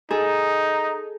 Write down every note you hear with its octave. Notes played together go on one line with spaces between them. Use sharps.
D#4 G#4 A4